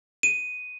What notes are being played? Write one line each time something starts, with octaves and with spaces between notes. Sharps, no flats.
D#7